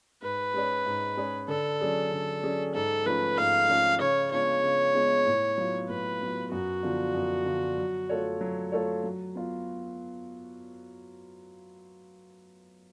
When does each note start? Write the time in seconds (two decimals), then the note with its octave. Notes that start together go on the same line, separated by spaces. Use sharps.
0.22 G#2 B4
0.54 G#3 C#4 G#4 C#5
0.86 G#2
1.17 G#3 C#4 G#4 C#5
1.48 D3 A4
1.80 F#3 C#4 G#4 D5
2.11 D3
2.43 F#3 C#4 G#4 D5
2.74 G#2 A4
3.06 F3 A3 C#4 B4
3.37 G#2 F5
3.69 F3 A3 C#4
4.00 C#3 C#5
4.31 G#3 B3 D4 F4 C#5
4.63 C#3
4.95 G#3 B3 D4 F4
5.26 A2
5.58 F#3 B3 F4
5.89 A2 B4
6.21 F#3 B3 F4
6.52 F#2 F#4
6.83 D3 F3 B3 F4
7.15 F#2
7.46 D3 F3 B3 F4
7.78 F#3
8.09 A3 F4 A4 C#5
8.41 F#3
8.72 A3 F4 A4 C#5
9.04 F#3
9.35 B3 F4